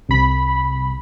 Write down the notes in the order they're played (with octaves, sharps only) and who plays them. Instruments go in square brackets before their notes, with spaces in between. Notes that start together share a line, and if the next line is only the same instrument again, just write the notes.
[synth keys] C2 B5